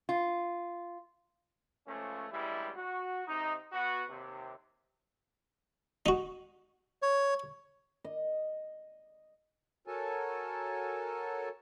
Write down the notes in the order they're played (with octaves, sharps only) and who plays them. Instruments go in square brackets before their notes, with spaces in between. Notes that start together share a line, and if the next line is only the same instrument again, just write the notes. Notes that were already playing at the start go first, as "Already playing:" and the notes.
[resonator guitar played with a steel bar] F4
[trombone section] C#2 F3 A3 C#4
A1 G2 G3 G#3 E4
F#4
C3 C4 D#4
B3 F#4
D#2 C3
[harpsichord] D#4 F#4
[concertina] C#5
[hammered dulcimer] D#5
[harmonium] F#4 A4 A#4 C#5 G#5 A5